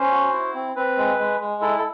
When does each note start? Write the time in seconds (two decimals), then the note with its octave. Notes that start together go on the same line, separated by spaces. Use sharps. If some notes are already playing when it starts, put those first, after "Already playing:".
Already playing: C#4 C5
0.12 F#4
0.33 E4
0.54 C4
0.76 C4 B4
0.97 G#3
1.19 G#3
1.40 G#3
1.61 E4 A4
1.78 A4